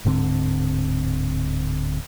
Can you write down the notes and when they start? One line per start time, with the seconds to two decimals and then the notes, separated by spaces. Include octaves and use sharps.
0.05 D1 G#2 D3 C4